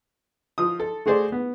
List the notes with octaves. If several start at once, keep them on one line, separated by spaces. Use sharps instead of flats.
F3 D#6
A4
A3 F#4 G#4 C5 D5
B3